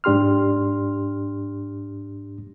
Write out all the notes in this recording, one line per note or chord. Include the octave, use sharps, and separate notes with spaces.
G#2 D4 G4 C6 F6